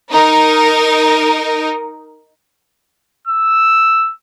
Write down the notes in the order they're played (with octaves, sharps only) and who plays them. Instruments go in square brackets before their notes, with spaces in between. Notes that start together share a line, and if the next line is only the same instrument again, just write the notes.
[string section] D#4 A#4
[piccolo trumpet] E6